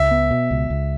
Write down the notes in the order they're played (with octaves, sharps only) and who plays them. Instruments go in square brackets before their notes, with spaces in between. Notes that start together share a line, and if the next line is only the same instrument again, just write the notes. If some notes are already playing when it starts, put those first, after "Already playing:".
Already playing: [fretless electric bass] C#2 [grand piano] E5
[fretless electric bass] B3
B2
C#2
C#2